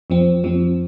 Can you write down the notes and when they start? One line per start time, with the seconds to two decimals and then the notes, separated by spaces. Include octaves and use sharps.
0.10 F2 F3 C4
0.44 F2 F3 C4